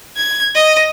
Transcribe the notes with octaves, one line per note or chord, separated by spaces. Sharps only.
G#6
D#5